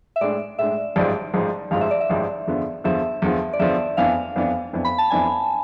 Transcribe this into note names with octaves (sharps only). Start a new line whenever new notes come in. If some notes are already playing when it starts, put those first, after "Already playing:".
E5
A2 G#3 D4 D5
A2 G#3 D4 E5
A1 G#2 F3 D5
A1 G#2 F3
A1 G#2 F3 F5
E5
D5
E5
A1 G#2 F3
E2 D3 F3 B3
E2 D3 F3 B3 E5
E2 D3 F3 B3
D5
E2 D3 F3 B3 E5
F2 E3 B3 D4 F5
F2 E3 B3 D4
F2 E3 B3 D4
B5
A5
F2 E3 B3 D4 G#5